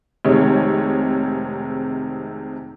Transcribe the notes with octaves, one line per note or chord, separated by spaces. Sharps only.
F1 C3 D#3 G#3 C#5